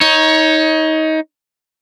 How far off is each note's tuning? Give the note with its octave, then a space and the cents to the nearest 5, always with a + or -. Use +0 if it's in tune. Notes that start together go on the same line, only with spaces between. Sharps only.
D#4 +25 C#5 +0